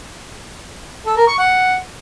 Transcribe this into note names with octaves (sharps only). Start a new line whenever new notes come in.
A4
A#4
C#6
F#5